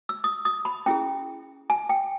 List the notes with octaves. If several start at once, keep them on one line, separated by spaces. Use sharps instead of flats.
E6
D#6
D#6
B5
C#4 E4 G#4 G5
G#5
G5